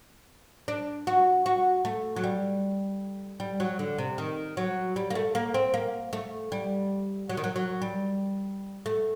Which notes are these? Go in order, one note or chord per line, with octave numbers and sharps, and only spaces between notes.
D4
F#4
F#4
A3
F#3
G3
G3
F#3
D3
C3
D#3
F#3
G3
A#3
A3
A#3
C4
A#3
A3
G3
F#3
D#3
F#3
F#3
G3
A3